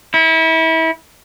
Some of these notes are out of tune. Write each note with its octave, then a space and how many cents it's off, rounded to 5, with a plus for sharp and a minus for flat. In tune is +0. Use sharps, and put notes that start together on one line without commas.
E4 -30